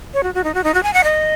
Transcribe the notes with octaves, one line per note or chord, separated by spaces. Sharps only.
C#5
F#4
F#4
D#4
F#4
D#4
F#4
G#5
F#5
D#5